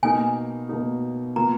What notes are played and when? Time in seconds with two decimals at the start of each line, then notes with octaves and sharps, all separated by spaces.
0.03 B2 A#3 D#4 G#5
0.69 B2 A#3 D#4
1.36 B2 A#3 F4 A#5